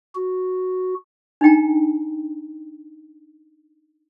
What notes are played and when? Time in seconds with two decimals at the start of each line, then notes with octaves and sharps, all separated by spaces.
0.15 F#4
1.41 D4 D#4 G5 A#5